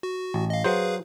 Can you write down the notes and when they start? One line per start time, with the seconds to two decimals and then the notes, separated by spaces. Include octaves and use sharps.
0.03 F#4
0.34 A1
0.50 D#5 F5
0.64 F#3 G#4 B4 C5 F5